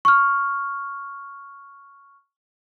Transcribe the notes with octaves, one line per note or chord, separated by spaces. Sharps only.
C#6 F6